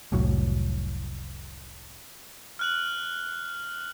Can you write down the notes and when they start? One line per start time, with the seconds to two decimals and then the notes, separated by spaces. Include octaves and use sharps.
0.12 F1 C2 A2 F#3
2.59 F6 F#6 F#7